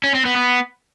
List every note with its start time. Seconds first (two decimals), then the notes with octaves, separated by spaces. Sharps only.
0.04 C#4
0.15 C4
0.26 B3
0.37 B3